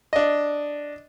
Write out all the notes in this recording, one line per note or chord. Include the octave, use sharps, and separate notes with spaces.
D4 D#5